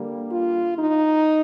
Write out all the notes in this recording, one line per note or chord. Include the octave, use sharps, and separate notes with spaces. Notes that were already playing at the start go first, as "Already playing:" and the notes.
Already playing: D3 G3 A#3
F4
D#4